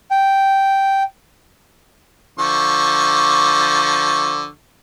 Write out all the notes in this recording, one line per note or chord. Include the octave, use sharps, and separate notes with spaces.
G5
D3 F3 C#6